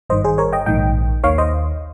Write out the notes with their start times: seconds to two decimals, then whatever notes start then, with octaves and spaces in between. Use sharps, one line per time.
0.10 G#1 G2 D#3 C5 D#5
0.24 G#4 C5
0.38 A#4 C#5
0.53 D#5 G5
0.66 A#1 G#2 D#3 D#5 G5
1.24 D#2 D#3 C#5 F5
1.38 C5 D#5